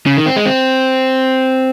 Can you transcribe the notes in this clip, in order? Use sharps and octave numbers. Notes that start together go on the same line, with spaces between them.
C#3
D#3
C4
G#3
C4